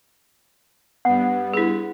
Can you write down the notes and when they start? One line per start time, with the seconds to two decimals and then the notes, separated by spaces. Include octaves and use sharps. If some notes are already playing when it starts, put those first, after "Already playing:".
1.05 G2 B3 F#5
1.53 E4 G#4